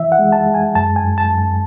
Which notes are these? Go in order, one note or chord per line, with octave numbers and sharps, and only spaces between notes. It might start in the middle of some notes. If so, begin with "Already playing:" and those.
Already playing: E3 E5
F#5
G#3
A5
G#3
G#5
F#2 A5
G#5
F#2
A5
F#2